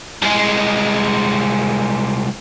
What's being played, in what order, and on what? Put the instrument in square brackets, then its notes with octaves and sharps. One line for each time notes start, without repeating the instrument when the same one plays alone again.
[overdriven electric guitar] C2 G#3